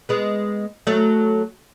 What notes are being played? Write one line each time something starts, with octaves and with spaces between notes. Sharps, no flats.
G#3 B3
F#3 A3